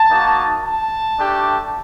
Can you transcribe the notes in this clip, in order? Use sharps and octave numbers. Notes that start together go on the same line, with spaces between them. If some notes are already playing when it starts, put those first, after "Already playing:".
Already playing: A5
A#3 D#4 F#4
A5
A3 D4 G4